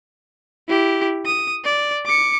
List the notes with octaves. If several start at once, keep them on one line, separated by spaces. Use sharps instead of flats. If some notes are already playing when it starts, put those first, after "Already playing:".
E4 G4
D#6
D5
D6 C#7